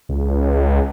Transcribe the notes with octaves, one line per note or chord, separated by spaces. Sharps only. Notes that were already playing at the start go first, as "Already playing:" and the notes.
C#2